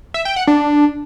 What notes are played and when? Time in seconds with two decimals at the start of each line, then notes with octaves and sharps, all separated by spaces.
0.14 E5
0.25 G5
0.36 F#5
0.47 D4